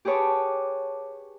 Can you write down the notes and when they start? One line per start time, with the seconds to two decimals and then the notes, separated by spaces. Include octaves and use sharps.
0.05 G4 G#4 B4 C#5 A5 D6